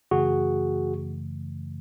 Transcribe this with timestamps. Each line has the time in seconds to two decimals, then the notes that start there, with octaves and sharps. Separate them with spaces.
0.11 F#2 C#3 E3 A3 F#4 G#4